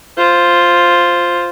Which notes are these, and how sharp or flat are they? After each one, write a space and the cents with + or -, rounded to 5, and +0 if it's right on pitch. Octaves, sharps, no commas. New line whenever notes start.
F4 +0 C5 +0